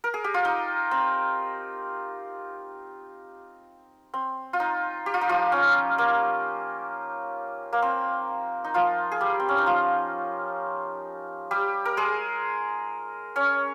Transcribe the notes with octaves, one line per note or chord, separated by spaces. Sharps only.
A#4
G#4
G4
F4
D#4
C4
C4
F4
D#4
G4
F4
D#4
F3 F4
C#4
A#3
A#3
C4
D#4
F3 F4
G#4
G3 G4
C4
C#4
D#4
F3 F4
G3 G4
A#4
G#3 G#4
C#4 C#5